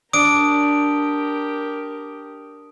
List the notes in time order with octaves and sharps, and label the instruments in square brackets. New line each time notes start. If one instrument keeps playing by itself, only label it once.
[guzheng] D4 [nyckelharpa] G4 A#4 [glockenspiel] D#6 D7